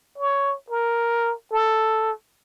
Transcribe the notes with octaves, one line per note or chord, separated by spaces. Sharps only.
C#5
A#4
A4